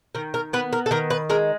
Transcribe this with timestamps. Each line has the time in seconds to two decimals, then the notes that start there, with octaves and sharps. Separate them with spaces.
0.15 D#3 A#4
0.34 A#4
0.53 B3 B4
0.73 A#4
0.86 A4
0.91 D#3 A#4
1.10 B4
1.30 G#3 A#4